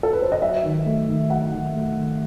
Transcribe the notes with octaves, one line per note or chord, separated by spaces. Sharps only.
A4
B4
C5
D#5
F#3 E5
D#3
A3
D#3
F#3 F#5
D#3
A3
D#3